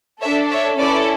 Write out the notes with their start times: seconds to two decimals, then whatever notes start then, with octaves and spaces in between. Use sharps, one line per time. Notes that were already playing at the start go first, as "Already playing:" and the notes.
0.22 A4 C#5 E5
0.26 D4
0.51 C#5 E5
0.78 C#4 E4 A4 B4 D5